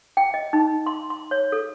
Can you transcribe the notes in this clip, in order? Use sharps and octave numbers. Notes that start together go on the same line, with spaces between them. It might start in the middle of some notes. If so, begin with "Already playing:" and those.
G5
D#5
D#4
C6
C6
C#5
A4